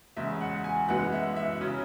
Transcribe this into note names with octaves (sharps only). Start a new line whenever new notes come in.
E2 C#3 G#3 E5
F#5
G#5
F#2 E3 G#3 B3 F#5
E5
E5
C#3 F#3 C#4